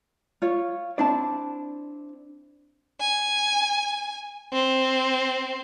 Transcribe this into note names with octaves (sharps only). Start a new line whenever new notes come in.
F4 C#5
C4 D4 E4 D5 A5
G#5
C4